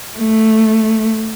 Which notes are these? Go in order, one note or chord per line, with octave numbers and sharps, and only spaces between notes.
A3